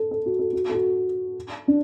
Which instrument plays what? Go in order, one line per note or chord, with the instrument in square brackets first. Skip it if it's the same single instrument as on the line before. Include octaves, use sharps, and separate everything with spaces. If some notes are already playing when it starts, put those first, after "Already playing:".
Already playing: [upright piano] A4
A4
F#4
A4
F#4
A4
F#4
D4